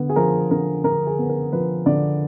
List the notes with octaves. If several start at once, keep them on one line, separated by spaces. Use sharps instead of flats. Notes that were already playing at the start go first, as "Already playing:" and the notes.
Already playing: D3 B3
G#4
F3 A#4
D3 A#4
D3 A#4
G#4
B3
A#4
F3 B4
D3 D5